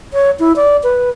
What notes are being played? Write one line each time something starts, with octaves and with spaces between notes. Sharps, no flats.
C#5
E4
D5
B4